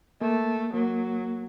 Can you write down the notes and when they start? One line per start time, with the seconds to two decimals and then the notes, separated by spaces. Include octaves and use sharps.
0.21 A3 A#3
0.74 F#3 A#3